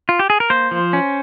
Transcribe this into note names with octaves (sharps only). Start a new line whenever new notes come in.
F4
G4
G#4
A#4
A#3 C5
F3
C#4